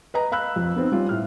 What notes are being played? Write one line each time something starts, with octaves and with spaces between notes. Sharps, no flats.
B4 D#5 A#5
F5 B5 E6 F#6
F2
B3 C4 D#4
G3 C#4 F4
A2 F6